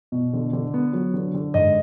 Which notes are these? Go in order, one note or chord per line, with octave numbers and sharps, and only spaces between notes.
B2
D3
D3
B3
F#3
D3
D3
G#2 D#5